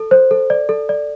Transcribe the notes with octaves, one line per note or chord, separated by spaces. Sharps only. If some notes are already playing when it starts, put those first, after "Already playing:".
Already playing: A4
C5
A4
D5
A4
D5